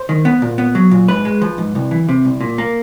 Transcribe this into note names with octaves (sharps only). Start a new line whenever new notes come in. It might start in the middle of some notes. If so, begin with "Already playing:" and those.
Already playing: C5
D#3
B3
A#2
B3
F#3
A#2
G#2 B4
G#3
F3
G#2
C2
E3
C3
C2
A#2
A#3